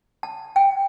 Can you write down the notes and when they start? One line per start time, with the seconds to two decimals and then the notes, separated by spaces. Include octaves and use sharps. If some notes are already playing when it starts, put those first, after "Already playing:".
0.23 A5
0.56 G5